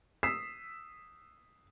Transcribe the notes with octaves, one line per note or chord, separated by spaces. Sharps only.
D#6 E6 B6 C7 E7